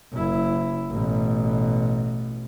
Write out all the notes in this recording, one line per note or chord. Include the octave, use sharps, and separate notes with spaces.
F#1 E4
A1 B2